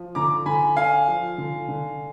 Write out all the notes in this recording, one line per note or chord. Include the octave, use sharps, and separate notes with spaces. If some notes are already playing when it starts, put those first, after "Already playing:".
Already playing: F3
D3 A#5 D6
D3 G#5 B5
D4 F5 G#5
F3
D3
D3